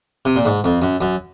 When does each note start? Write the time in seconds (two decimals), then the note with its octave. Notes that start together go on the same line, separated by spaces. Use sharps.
0.25 C3
0.36 A#2
0.45 G#2
0.64 F2
0.82 F#2
1.01 F#2